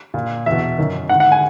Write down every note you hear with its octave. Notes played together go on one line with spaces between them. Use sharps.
A#2
E2 B2 E5
F#2 D#3
G#2 D#3 F#5
F#5
G#5